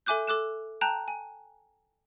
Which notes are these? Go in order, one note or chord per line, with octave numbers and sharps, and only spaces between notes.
A4 E5 G#5 D6 F#6 G6
A4 D6 F#6 E7
G5 A5 A#5 F#6 G6
G#5